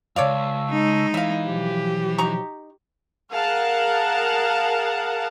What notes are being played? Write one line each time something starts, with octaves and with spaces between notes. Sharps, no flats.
C#2 F#2 C#5 D5 F5 A5 C#6 E6
G#3 D#4
E3 E5 F5
B2 F3 F#3 G4
D#4 A#5 C#6
G#4 A#4 F5 F#5 A5